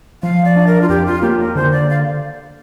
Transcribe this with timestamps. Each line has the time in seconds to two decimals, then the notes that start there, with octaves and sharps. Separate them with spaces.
0.23 F3 F5
0.45 D5
0.56 D4
0.67 A#4
0.82 F4
0.89 F2 G4
1.06 F4
1.23 A#3 G4
1.39 A#4
1.55 D3 C5
1.72 D5
1.90 F5